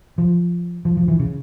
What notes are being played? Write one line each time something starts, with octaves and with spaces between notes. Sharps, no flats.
F3
F3
F3
E3
C#3